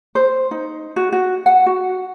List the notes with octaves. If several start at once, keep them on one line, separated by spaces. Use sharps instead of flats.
C5
D#4
F#4
F#4
F#5
F#4